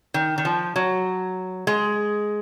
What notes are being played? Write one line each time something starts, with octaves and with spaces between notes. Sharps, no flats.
D#3
D#3
F3
F#3
G#3